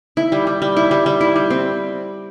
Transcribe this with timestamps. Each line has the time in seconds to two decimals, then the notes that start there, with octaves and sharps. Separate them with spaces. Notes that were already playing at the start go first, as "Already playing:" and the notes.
0.17 E4
0.32 G3
0.47 G3
0.62 G3
0.77 E4
0.91 G3
1.06 G3
1.21 E4
1.36 G3
1.50 C4